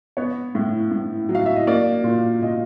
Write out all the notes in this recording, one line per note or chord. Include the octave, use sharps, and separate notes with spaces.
B3 C#5
A2
A2
F#3
F5
E5
D#5
A#3 D5
A#2
A#2 D#5